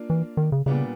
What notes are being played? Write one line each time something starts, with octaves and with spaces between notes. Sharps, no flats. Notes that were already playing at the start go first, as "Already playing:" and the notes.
Already playing: A#3 D4 F4
E3
D#3
C#3
A#2 C#3 G3 B3 D4